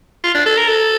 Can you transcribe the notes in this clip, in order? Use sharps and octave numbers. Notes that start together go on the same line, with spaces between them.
F4
D4
A4
A#4
A4